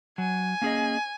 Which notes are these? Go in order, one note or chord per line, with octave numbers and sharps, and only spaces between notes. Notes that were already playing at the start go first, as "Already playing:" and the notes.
F#3 G#5
A#3 C#4 G#4 D#5